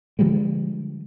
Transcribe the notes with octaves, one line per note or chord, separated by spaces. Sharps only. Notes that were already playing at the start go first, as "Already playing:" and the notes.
D3 F3 G3 G#3